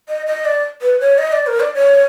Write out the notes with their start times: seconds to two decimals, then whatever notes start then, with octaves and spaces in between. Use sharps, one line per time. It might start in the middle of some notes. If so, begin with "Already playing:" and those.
0.09 D#5
0.27 D#5
0.45 D5
0.82 B4
1.00 C#5
1.18 D#5
1.32 D5
1.47 A#4
1.60 D5
1.74 C#5